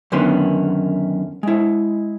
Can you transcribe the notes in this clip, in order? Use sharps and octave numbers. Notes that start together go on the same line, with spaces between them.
F#2 D3 D#3 B3 C#4 C6
G#3 E4